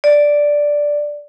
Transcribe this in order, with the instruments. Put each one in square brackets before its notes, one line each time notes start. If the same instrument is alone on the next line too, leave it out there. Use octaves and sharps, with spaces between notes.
[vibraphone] D5